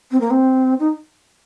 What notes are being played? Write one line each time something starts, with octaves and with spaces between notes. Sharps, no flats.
C4
A#3
C4
D#4